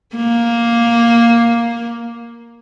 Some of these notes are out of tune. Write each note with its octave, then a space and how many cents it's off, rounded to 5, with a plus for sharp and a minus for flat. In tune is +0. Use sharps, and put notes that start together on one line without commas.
A#3 +5